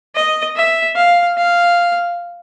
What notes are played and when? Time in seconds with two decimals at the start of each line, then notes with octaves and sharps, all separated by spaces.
0.15 D#5
0.56 E5
0.96 F5
1.37 F5